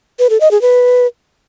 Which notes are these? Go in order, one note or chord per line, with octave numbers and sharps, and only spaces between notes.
B4
A4
D#5
G#4
B4